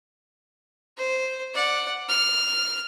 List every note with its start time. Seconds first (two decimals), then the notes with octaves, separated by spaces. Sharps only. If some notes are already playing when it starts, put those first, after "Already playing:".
0.97 C5
1.54 D5 F#5
2.09 F6